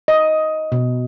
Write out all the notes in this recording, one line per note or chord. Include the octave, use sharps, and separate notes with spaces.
D#5
B2